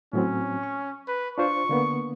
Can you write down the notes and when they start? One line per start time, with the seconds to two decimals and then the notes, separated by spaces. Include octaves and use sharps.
0.13 A2 F#3 C4 C#4
0.63 C#6
1.08 B4
1.38 D4 F4 C5 C#6
1.69 D3 A#3 B3